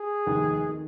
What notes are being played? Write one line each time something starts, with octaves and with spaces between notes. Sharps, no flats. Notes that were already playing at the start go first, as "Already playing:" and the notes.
Already playing: G#4
F1 D#2 D#3
D#3